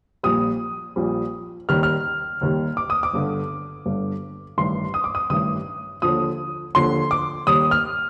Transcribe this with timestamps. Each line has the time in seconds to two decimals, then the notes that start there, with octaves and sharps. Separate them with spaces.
0.23 A#1 A#2 G3 D#6
0.96 A#1 A#2 G3
1.69 D#2 D#3 G3 F6
1.83 F6
2.41 D#2 D#3 G3
2.77 D6
2.90 D#6
3.03 D6
3.13 G1 G2 D3
3.85 G1 G2 D3
4.58 A1 G2 D#3 C6
4.94 D#6
5.04 D6
5.15 D#6
5.30 A1 G2 D#3 D#6
6.02 D#2 D3 F3 D#6
6.75 D#2 D3 F3 C6
7.11 D6
7.47 D#2 D#3 G3 D#6
7.71 F6